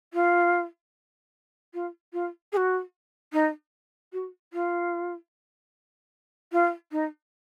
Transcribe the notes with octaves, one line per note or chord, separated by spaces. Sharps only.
F4
F4
F4
G#4
F#4
D#4
F#4
F4
F4
D#4